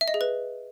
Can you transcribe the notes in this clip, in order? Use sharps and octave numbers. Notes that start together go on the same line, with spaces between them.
E5
D#5
G#4
B4